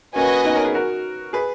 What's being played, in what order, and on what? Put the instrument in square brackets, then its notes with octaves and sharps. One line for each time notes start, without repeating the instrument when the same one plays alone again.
[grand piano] A#3 C#4 [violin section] F#4 B4 D#5 G#5
[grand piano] B3 D#4
A#4 C#5
G#4 B4
F#4 A#4
G#4 B4